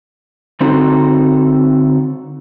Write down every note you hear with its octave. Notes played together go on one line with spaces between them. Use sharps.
D3 C4 D#4 F#4 A4